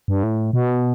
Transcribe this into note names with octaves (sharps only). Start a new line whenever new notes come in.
G2
A2
B2